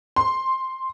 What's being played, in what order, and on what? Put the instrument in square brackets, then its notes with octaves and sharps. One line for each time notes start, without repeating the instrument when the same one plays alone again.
[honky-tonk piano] C6